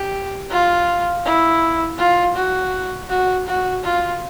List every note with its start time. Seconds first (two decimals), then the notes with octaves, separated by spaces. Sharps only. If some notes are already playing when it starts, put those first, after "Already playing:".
Already playing: G4
0.50 F4
1.25 E4
1.98 F4
2.36 F#4
3.09 F#4
3.47 F#4
3.83 F4